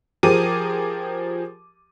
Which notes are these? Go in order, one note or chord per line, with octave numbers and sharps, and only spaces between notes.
F3 G4 G#4 A#4 D6 D#7